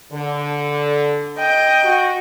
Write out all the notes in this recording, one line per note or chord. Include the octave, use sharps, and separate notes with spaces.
D3
D#5 G5
F#4